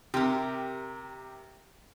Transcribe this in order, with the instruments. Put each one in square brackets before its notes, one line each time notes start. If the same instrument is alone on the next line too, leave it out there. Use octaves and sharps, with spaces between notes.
[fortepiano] C3 [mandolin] G4 A#4